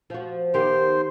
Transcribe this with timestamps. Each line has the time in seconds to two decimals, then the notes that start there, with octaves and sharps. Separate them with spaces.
0.10 F3 F#4
0.54 D#3 B3 G4 C5